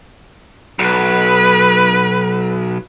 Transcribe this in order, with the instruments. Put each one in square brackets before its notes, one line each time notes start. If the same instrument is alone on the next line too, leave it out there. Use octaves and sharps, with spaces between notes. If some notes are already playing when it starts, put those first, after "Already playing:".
[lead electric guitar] B1 [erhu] B4